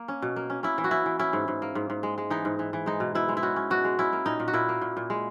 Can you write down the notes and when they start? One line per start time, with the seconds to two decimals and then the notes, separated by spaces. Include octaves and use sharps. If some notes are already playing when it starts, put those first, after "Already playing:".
Already playing: A#3
0.08 C#4
0.22 B2
0.36 A#3
0.50 C#4
0.63 C#4 E4
0.78 E3
0.84 F#4
0.91 C#4 E4
1.06 E3
1.19 C#4 E4
1.33 G#2
1.48 G#2
1.62 A#3
1.75 G#2
1.90 G#2
2.03 G#3
2.18 G#3
2.30 E3 D#4
2.45 G#2
2.59 E3
2.73 E3
2.86 G#3 D#4
3.00 B2
3.15 B2 E4
3.29 G#3
3.37 E4
3.43 C#4 F#4
3.56 C#4
3.70 B2 F#4
3.84 G#3
3.99 C#4 E4
4.13 A#3
4.26 A#2 D#4
4.40 A#2
4.48 F#4
4.53 A#2 E4
4.69 A#3
4.81 A#2
4.97 A#2
5.10 G#3